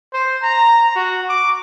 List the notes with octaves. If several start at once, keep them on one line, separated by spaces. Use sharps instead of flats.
C5
A#5
F#4
D6